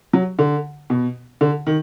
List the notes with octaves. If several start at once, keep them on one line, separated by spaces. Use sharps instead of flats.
F#3
D3
B2
D3
D#3